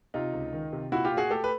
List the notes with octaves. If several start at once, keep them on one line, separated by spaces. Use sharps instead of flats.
C3 D#4 F4
C#2
D#3
C3
A#2 E4 F#4
F4 G4
A#2
F#4 G#4
A3 G4 A4
B4